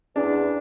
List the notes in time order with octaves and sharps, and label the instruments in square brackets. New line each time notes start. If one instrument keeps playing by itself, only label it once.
[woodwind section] E2 [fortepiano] D4